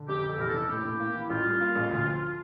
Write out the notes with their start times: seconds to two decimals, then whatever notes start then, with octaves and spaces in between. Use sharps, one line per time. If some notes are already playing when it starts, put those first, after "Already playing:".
Already playing: D3
0.08 F1 G4
0.23 F1
0.29 A4
0.38 E2 A#4
0.48 A4
0.53 F1
0.69 A2 G4
0.84 A2
1.00 A#3
1.14 E3 E4
1.30 A1 F4
1.45 G3
1.60 A#3
1.75 A1
1.91 D2
2.06 F3